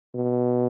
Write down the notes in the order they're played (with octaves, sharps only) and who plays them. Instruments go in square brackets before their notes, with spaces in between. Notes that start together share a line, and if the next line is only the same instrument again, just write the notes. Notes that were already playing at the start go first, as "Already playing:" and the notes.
[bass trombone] B2